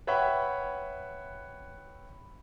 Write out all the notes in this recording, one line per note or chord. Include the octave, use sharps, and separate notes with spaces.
B4 C#5 E5 F#5 G5 B5